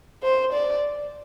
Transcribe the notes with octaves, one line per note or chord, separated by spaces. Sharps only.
C5
D5